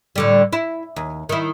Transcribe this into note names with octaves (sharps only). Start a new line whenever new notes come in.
A2 D3 G3
E4
D#2
D#3 E4